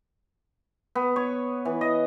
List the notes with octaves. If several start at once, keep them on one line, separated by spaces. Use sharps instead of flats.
B3
C#5
E3
D#5